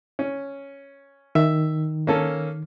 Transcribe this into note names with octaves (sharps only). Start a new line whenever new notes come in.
C#4
D#3 E5
A#3 C#4 A4